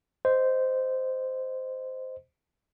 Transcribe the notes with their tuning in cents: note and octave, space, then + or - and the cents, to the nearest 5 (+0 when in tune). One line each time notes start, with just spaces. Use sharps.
C5 -10 D#5 +0